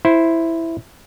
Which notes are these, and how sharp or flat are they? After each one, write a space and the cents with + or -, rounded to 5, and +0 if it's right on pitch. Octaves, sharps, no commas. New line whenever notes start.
E4 +0 C5 +0